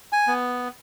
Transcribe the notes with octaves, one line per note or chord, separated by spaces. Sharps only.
G#5
B3